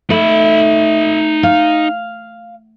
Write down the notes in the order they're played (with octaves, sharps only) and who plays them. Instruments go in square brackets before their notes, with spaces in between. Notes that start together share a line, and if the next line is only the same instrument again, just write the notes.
[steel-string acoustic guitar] A3 [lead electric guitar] D#4 B5
[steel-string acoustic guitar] F5